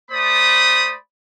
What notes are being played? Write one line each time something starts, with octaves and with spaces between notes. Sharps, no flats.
A3 C5 D5 B5 D#6